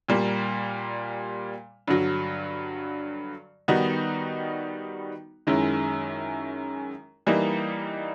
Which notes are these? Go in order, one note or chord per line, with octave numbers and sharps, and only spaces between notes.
A#2 G3 A#3
G2 D3 F#3
D#3 G3 B3 D#4 F#4
F#2 D#3 G#3 C#4 E4
E3 G3 A#3 D#4